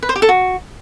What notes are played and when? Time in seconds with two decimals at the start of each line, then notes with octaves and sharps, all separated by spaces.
0.03 B4
0.09 C5
0.16 G4
0.22 A4
0.29 F#4